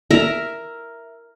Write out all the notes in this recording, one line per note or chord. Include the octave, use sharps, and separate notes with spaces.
A#4 E5 A#5